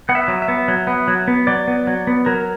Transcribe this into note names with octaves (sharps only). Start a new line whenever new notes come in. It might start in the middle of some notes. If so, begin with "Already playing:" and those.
B3 F#5
E5
F#3
E5
B3
F#3
B3
F#3
B3
F#3 D5
B3
F#3
B3
F#3 A#4